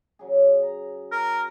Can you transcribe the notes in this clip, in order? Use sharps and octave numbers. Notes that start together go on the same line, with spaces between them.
C#3 F#3 G#4
A#5
A#4